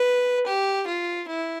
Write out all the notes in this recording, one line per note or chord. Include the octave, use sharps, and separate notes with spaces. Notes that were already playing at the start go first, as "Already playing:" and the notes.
Already playing: B4
G4
F4
E4